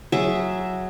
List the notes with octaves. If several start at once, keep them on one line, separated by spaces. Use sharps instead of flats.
F#3 G#4 E5